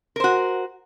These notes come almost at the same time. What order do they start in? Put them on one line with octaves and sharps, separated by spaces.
A#4 C5 F#4